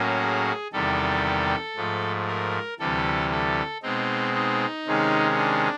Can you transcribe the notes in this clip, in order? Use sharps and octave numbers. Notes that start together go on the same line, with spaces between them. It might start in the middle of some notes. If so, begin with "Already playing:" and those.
Already playing: A2 F#3 A#3 C#4
G#4
E2 C3 D#3 G3 A4
G#2 F3 A3
A#4
D2 C3 E3 G3 A4
A4
B2 G#3 C4 D#4
D#4
C3 D#3 G#3 C#4
D4